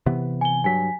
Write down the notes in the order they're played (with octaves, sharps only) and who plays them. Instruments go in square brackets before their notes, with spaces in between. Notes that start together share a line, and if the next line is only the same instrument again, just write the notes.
[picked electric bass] C3 E3 B3
[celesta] G#5 G7
[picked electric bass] G2 F#3 [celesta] G#5 B6